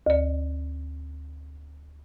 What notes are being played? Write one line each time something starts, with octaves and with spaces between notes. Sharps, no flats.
D2 D5